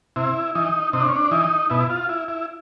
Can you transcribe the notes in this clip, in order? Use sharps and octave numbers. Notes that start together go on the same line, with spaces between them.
C3 E4
E3 D#4
C3 D#4
D4
C#4
D4
E3 D#4
B2 E4
F4
E4
E4